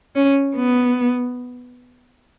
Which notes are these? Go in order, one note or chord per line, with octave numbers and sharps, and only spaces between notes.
C#4
B3